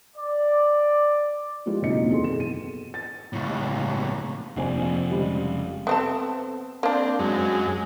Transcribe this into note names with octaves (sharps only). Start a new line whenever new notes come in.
D5
F3 G#3 E4 F4 G4
C2 F#2 A#2 D#4 D#5 C#7
E2 G#4 A4 C6
B1 E7
D#7
A6
C#2 A2
F1 A#1 C4 G#5
C#3 G3 G#3
B3 C4 A4
A#3 C4 D4
F#2 G#3